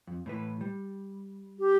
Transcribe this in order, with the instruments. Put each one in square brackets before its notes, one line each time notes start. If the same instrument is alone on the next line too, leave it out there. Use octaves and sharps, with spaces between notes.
[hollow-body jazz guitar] F2
A2 E3 B4
G3
[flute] G4